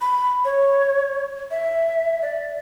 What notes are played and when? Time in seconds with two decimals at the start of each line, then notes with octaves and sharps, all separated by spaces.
0.01 B5
0.45 C#5
1.51 E5
2.22 D5